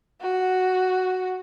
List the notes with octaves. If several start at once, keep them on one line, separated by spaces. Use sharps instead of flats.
F#4